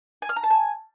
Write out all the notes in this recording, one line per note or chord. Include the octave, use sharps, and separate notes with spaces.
G#5
F6
A#5
A5
G#5